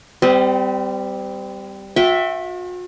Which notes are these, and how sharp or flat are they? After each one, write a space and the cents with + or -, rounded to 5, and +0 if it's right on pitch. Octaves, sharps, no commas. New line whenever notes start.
G3 +0 C4 -35 D#5 -35
F#4 -45 E5 +0 G5 -15